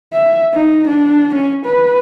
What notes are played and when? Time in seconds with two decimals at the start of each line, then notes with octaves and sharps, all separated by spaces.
0.13 E5
0.54 D#4
0.87 D4
1.34 C#4
1.65 B4